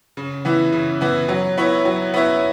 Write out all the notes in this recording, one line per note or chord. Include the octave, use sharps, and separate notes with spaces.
C#3
E3 B3 E4
C#3
E3 B3 E4
F#3
B3 E4 C#5 E5
F#3
B3 E4 C#5 E5